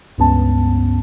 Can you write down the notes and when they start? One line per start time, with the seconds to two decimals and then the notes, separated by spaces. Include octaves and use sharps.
0.18 C#2 G2 B3 C#4 A5